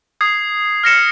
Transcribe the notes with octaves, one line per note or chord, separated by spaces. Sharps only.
D#6 G#6 C7
F6 A#6 C#7 E7